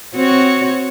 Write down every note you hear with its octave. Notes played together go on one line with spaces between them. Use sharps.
C4 F#4 C#5